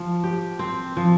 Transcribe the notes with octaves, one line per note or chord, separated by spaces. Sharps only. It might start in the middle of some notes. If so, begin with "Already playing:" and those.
Already playing: F3
G4
C4
F3